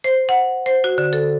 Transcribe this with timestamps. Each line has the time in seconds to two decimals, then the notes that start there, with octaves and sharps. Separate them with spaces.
0.04 C5
0.29 F#5
0.66 C5
0.84 F#4
0.98 D3
1.13 A4